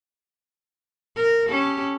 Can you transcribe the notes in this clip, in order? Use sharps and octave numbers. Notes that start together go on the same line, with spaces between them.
A#4
C#4 G4 A4